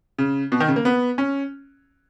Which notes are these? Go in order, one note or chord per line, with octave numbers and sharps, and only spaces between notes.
C#3
B2
D#3
C#3
A#3
B3
C#4